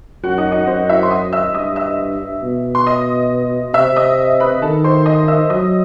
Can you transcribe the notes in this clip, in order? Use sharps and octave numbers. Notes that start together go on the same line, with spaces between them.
F#2 F#4 F#5
D#4 D#5
D#4 D#5
F#2 C4 C5
E4 E5
C6
D#5 D#6
E5 E6
G2 D#5 D#6
E5 E6
B2
C6
D#5 D#6
C3 E5 E6
D#5 D#6
B4 B5
D#3 A4 A5
C5 C6
D#5 D#6
E5 E6
F#3 D#5 D#6